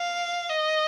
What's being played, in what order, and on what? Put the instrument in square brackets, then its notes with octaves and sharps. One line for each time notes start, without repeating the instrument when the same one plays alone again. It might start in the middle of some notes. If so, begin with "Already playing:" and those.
Already playing: [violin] F5
D#5